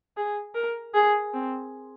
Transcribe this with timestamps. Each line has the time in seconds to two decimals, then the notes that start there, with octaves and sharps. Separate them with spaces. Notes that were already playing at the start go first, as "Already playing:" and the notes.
0.17 G#4
0.55 A#4
0.94 G#4
1.34 C4